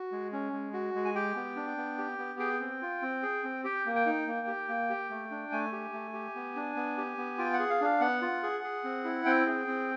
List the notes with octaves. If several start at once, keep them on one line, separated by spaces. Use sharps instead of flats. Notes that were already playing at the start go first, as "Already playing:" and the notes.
Already playing: F#4
G#3
C#4
G#3
F#4
G#3
G#5
G4 G5
B3
D4
B3
G4
B3
G#4 G5
C4
F4
C4
G#4
C4
G4 G5
A#3
G5
D#4
A#3
G4
A#3
G4
A3
D4
A3 G#5
G4
A3
G4
B3
D4
B3
G4
B3
F4 G5
F#5
G#4
F5
D4 F5
B3 F#5
F4
G#4
G#4
C4
E4
C4 G5
G#4
C4